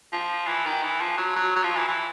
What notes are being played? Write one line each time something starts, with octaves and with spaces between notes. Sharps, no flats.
F3
E3
D#3
E3
F3
F#3
F#3
F#3
F3
E3
E3